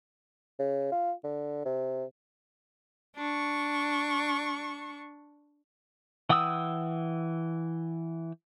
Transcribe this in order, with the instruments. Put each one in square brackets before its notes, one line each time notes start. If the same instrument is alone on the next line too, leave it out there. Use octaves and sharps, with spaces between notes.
[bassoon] C#3
F4
D3
C3
[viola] D4 C#6
[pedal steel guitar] E3 F#5 G5 D#6 E6